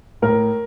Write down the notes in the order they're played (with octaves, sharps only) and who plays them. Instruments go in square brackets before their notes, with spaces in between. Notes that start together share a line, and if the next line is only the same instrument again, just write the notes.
[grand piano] A2 A#4